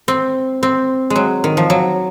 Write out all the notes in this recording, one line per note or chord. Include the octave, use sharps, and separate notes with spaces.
C4
C4
G#3
F#3
D#3
F3
F#3